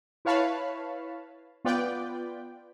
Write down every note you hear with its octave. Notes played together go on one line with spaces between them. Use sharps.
E4 B4 C#5 F5 A5 B5
B3 F4 B4 D5 G5